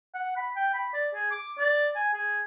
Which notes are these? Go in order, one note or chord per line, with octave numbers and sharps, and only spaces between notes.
F#5
B5
G5
B5
D5
G#4
D6
D5
G#5
G#4